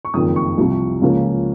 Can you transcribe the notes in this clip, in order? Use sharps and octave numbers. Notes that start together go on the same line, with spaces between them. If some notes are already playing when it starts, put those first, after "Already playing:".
C#6
F#1 F2 D#3 D#6
C#6
C2 C3 F3
C#2 C#3 F3 A#3 C#4